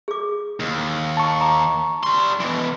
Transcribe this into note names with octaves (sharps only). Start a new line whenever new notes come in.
G#4 D6
D#2
A5 C#6
A#5 D6
G3 C6
B2 E3